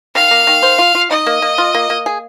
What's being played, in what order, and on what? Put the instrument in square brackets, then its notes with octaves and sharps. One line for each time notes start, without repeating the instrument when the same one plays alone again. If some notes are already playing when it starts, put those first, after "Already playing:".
[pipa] D#3 [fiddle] F5
[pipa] A#3
D#3
C5
F4
F4
[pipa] D#4 [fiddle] D#5
[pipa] A#3
A#3
F4
A#3
A#3
G#4